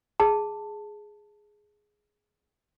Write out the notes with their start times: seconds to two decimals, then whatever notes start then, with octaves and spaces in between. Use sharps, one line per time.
0.20 G#4 A5